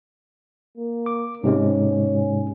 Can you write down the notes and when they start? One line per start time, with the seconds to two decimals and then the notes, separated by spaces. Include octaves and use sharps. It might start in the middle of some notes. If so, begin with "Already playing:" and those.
0.77 A#3
1.06 D6
1.44 G#2 C3 G#3 C#4